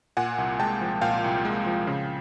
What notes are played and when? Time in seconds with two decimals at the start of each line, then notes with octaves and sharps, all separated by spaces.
0.17 A#2 F#5 G#5
0.38 C2
0.60 G#3 G5 A5
0.81 F3
1.01 A#2 F5 G5
1.24 C2
1.45 G#3
1.66 F3
1.87 C#3